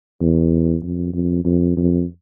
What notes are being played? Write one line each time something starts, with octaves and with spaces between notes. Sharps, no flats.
E2
F2
F2
F2
F2